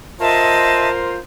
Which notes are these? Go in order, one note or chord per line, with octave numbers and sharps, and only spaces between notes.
F4 A#4 C5 D#5 E5 A5